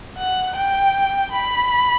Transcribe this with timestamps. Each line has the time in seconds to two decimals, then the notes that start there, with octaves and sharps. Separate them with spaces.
0.18 F#5
0.56 G5
1.32 B5